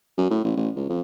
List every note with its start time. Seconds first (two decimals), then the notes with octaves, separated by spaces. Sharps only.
0.17 F#2
0.30 A2
0.44 A1
0.57 A1
0.76 C#2
0.89 F2